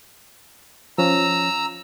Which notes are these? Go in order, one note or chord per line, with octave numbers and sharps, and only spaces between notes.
F3 C#4 A#5 E6